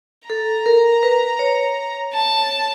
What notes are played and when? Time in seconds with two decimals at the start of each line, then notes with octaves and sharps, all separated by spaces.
0.29 A4 A#5
0.66 A#4
1.03 B4
1.39 C#5
2.13 A5